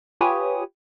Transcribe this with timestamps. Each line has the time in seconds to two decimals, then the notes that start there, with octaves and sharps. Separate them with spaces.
0.21 F4 G4 B4 C#5 G#5 D#6